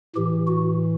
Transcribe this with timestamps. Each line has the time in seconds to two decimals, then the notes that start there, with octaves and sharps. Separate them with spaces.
0.15 A2 E3 G4
0.47 F#4